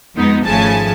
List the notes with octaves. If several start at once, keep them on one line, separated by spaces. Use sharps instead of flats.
F2 G#3 B3 D#4
G#1 C#3 F3 A3 G#5 A5